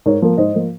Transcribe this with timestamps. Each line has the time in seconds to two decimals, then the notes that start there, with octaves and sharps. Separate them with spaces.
0.06 G#2 A#4 C#5
0.22 F3 A#3
0.37 G#2 C5 D#5
0.55 F3 A#3